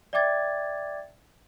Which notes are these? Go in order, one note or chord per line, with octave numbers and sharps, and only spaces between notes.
D5 E5 G5 D6 G#6 A6